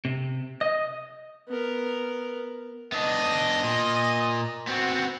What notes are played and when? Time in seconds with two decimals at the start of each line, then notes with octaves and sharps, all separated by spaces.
0.05 C3
0.61 D#5
1.48 B3 A#4
2.92 B3 D4 D#5
3.64 A#2
4.67 B3 C4 F#4